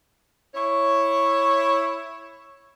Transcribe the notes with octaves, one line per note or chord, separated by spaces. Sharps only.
E4 C#5